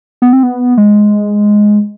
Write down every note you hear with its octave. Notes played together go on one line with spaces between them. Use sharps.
B3
C4
B3
G#3